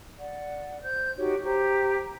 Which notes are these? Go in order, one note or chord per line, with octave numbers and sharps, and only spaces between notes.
D5 F#5
C5 G6
D#4 F#4 G4 C#5
G4 C5 A#5